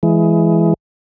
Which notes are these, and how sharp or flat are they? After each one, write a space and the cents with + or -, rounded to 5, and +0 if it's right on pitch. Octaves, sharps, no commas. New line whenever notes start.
E3 +15 G#3 +15